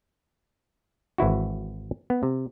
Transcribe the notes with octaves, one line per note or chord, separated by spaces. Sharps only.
G#1 E3 E4 F#4
B3
C3